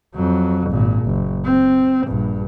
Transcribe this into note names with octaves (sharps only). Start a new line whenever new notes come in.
F2 F#3
G#1 A#2
F#1
C4
A#1 G2